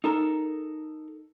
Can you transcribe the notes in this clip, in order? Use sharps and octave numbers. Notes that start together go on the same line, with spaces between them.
D#4 A4 A#4